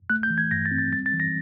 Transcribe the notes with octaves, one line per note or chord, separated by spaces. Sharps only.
A3 F#6
G6
E3
G#6
G2 A#6
A6
C4
A6
G3 A6
A6
E3
A#6